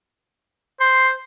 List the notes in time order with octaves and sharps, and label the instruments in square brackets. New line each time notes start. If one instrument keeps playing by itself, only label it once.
[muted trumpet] C5 [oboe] C6